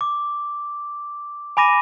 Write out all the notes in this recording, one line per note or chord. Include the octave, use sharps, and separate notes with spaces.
D6
G#5 B5 D6 A#6 D#7